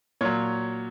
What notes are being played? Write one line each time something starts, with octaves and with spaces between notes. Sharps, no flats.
A#2 F#3 C#5